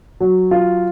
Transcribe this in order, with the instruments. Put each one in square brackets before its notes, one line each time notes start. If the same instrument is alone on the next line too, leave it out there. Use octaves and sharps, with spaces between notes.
[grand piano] F#3
F4